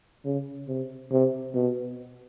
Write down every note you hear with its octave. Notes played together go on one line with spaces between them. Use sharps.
C#3
C3
C3
B2